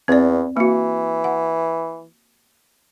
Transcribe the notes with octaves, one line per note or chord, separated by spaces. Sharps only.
E2 C4 D5
E3 A#3 F#4
F#5